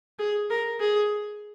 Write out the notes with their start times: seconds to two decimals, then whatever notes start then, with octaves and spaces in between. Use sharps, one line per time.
0.19 G#4
0.50 A#4
0.80 G#4